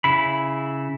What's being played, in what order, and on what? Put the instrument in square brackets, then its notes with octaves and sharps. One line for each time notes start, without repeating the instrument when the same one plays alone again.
[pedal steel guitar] C#3 E4 B5